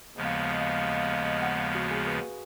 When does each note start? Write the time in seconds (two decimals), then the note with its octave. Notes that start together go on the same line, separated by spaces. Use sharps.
0.16 D#2 C#3 F3 G#3 B3 D#5
0.25 F5
0.33 D#5
0.43 F5
0.51 D#5
0.61 F5
0.69 D#5
0.78 F5
0.87 D#5
0.96 F5
1.06 D#5
1.15 F5
1.23 D#5
1.42 F#5
1.59 F5
1.74 F#4
1.91 G#4
2.07 B4